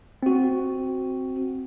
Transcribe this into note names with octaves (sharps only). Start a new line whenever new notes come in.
C4 F#4